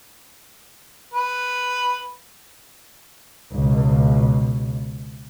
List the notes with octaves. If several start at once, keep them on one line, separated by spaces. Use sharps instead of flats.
B4
C#2 B2